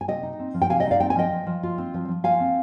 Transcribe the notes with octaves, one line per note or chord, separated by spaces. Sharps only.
G#5
C3 D#5 G5
D#4
C4
F3
G5
C3 F5 G#5
D#5 G5
D#4
D5 F5
C4 G5
G#5
F3 D#5 G5
F3
F3
F4
C4
F3
F3
F4 F5 G#5
C4